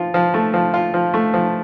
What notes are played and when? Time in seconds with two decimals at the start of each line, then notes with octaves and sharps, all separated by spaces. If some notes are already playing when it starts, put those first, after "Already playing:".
Already playing: F3 F4
0.14 F3
0.34 A3
0.54 F3
0.74 F4
0.94 F3
1.14 A3
1.34 F3